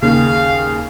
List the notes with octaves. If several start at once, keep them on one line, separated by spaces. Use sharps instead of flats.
D#2 C#3 G#4 F5